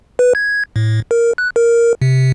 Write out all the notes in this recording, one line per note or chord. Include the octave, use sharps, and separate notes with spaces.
B4
G#6
A2
A#4
F#6
A#4
C3